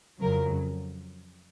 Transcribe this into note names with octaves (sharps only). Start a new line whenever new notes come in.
F2 C#3 F#3 A#4